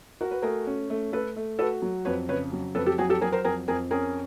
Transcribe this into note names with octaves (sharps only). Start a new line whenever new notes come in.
F#4 A#4
B4
A3 G#4 A#4
C#4
A3
A3 A4 B4
A3
F#4 A4 B4
F#3
F2 B4 C#5
C#3 B4 C#5
F#3
F2 A4 B4
G4 A4
F#3 F#4 G#4
G4 A4
F#3 G#4 A#4
A#4 C5
F2 G#4 A#4
F2 G#4 A#4
C#4 G#4 A#4